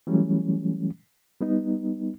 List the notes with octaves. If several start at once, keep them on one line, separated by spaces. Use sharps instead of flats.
E3 F#3 G3 A3 C#4
G3 B3 D#4